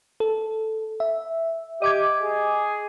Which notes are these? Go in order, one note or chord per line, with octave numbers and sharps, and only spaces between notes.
A4
E5
G4 D#5 D6 G#6
G#4